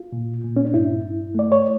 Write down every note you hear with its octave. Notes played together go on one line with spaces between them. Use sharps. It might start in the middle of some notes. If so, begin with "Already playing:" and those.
Already playing: F4
A#2
A#2
C#4
D4
G2 E4
G2
A3 D5
C#5